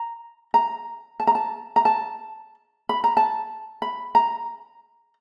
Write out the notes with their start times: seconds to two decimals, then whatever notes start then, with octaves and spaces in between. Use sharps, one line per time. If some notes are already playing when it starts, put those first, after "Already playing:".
Already playing: A#5
0.54 A#5
1.20 A5
1.27 A#5
1.35 A5
1.76 A#5
1.85 A5
2.89 B5
3.04 A#5
3.17 A5
3.82 B5
4.15 A#5